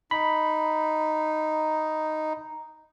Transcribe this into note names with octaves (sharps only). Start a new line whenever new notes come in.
D#4 B5